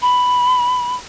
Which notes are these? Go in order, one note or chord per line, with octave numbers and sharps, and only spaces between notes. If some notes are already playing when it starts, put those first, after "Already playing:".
B5